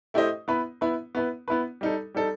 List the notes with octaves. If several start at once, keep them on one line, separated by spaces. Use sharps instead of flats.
A3 E4 G4 C5 D#5
B3 E4 B4
B3 E4 B4
B3 E4 B4
B3 E4 B4
G3 D#4 A4
G3 D#4 A4